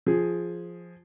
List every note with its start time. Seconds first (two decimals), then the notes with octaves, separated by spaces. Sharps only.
0.06 F3 G#4